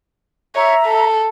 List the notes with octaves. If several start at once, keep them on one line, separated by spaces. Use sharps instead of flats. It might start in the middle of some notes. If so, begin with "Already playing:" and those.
C#5 E5 A#5
A4